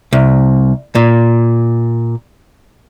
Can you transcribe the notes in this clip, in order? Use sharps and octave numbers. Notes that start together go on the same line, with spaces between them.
C2
A#2